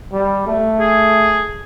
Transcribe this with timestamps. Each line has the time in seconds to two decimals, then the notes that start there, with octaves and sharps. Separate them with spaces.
0.13 G3
0.47 A3
0.80 G#4